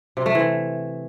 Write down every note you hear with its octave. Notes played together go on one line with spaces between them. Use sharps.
C3
A3
E3